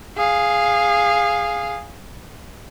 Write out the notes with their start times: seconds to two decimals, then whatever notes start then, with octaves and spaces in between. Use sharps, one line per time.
0.17 G#4 F5